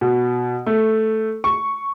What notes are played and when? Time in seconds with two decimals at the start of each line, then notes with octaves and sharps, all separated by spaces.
0.01 B2
0.66 A3
1.44 C#6